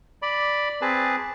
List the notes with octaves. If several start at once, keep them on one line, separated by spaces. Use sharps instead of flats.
D5 B5
C4 G#4 B4 A5